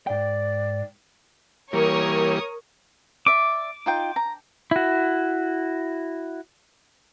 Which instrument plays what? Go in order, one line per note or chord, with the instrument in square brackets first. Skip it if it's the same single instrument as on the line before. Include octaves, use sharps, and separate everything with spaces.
[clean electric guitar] G#2 G5 [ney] D5
[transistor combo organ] E3 G3 A#3 [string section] A#4 C#5 D#6
[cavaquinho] D5 E5 [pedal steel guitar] D6
[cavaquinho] D#4 F4 G5
A#5
[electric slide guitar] E4 F#4